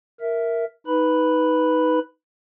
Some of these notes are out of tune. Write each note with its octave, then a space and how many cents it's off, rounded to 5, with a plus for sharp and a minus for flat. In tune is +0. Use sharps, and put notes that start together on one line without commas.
A#4 +0 E5 +0
D#4 +15 B4 +0 B5 +0